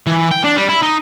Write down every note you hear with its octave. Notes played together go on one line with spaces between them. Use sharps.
E3
G5
D4
G3
E4
D#4